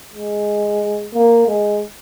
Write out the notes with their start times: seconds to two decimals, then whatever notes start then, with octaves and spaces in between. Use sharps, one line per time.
0.13 G#3
1.14 A#3
1.48 G#3